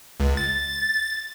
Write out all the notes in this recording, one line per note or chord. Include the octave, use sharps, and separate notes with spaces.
C#2
A6